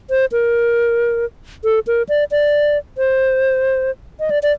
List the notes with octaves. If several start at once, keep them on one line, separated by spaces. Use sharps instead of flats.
C5
A#4
A4
A#4
D5
D5
C5
D#5
D5
D5